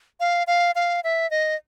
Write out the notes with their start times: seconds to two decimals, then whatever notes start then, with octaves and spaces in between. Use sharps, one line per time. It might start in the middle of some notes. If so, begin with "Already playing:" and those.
0.20 F5
0.47 F5
0.75 F5
1.04 E5
1.31 D#5